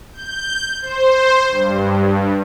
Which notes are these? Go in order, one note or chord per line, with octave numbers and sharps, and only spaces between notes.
G6
C5
G2